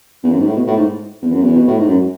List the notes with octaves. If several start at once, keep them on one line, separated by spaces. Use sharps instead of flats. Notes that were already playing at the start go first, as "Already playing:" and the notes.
E2
F#2
G#2
A2
B2
A2
G#2
E2
F#2
E2
B2
A2
G#2
F#2